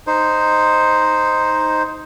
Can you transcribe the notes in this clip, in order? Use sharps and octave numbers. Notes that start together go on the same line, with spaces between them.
D#4 C5